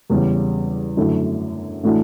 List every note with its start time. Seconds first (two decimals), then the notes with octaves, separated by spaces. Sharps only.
0.10 E2 C#3 G3
0.97 F#2 D3 A3 E4
1.83 A2 E3 A3 D4 F#4